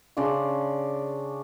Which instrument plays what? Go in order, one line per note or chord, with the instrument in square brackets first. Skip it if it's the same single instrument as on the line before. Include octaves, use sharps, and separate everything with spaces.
[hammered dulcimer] C#3 D4 D5 C6